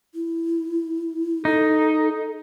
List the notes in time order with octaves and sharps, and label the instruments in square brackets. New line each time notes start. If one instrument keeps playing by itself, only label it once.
[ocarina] E4
[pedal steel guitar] D#4 [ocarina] A4